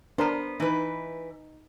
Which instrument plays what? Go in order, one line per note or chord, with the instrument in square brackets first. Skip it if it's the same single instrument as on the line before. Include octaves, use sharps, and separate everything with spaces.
[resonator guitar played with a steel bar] B3 C5 [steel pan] D4 A#4
[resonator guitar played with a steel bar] E3 B4 [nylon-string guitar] D#4